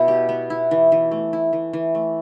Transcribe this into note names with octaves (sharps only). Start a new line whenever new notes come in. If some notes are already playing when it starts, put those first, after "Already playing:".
Already playing: B2 B3 E4
G4
B3
E4
E3
E3
A3
E4
E3
E3
A3